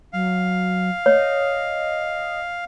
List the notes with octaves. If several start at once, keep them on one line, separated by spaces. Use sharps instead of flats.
F#3 F5
C#5 D#5